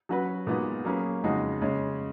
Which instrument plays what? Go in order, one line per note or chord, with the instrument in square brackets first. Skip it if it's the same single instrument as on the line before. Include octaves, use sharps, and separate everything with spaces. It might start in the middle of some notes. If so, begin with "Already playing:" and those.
[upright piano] F#3 C#4 F#4 B4
A#2 G#3 B3 D#4 F#4
F#3 A#3 C#4 G#4 B4
F2 C#3 G#3 D#4 F#4
C#3 G#3 C#4